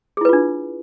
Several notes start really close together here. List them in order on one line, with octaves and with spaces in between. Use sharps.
G#4 E4 B4 F4 D4